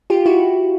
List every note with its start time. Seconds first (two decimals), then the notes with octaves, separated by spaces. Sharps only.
0.10 F4 G4
0.26 E4 F#4